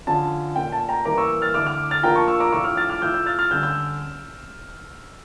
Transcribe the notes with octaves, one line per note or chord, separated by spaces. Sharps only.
D3 F3 C#4 A5
A#2 A3 C#4 G5
A5
G5 A#5
E3 G3 A#3 E4 A#5 D6
C#6 E6
F6 A6
D3 A3 E4 D6 F6
D6 F6
F6 A6
F3 A#3 D4 F4 G5 A#5
A5 C#6
C#6 E6
A#5 D6
A2 F3 A3 D4 C#6 E6
D6 F6
F6 A6
D6 F6
F3 A3 E4 E6 G6
E6 G6
F6 A6
F6 A6
D3 G3 C#4 E6 G6
E6 G6